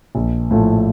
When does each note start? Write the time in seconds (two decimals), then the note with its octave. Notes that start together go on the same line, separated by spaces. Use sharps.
0.15 A#1
0.51 A2 F3 A3